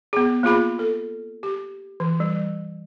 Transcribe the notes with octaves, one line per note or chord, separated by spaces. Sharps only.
B3 G#4
A#3 F4 G#4 B5
A4
G4
E3
G3